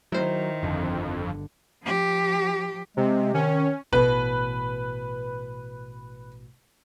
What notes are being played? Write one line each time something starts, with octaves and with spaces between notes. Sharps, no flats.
D#3 F#3 E4 A#4 C5
G1 F2 D3
F3 G4
C3 G#3
D#3 C#4
A1 B2 B4